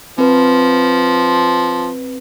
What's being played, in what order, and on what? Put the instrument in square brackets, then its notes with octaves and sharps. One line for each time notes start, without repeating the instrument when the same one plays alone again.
[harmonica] F3 [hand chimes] C4 B4